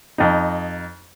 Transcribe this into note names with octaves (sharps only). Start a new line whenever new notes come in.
F2 D#4